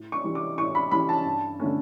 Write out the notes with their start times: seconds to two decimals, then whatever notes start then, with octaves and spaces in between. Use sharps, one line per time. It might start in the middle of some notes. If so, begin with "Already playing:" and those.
Already playing: A2
0.12 C#6
0.24 E3 G3 C#4
0.35 D6
0.58 A2 C#6
0.75 B5
0.91 E3 G3 C#4 B5
1.09 A5
1.26 G2
1.60 D3 A3 C#4